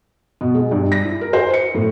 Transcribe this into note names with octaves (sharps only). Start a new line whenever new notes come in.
B2
G#3
G2
A#6
E4
A#4
C5
C#7
A2